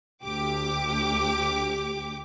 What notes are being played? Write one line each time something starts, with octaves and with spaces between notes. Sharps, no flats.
D2 G4 D6